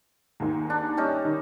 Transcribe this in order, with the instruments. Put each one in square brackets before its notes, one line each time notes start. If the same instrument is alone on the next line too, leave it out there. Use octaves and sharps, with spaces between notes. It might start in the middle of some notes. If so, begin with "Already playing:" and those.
[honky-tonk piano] D#2 G#2
[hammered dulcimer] D4
G3 C#4 D#4
[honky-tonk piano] D#3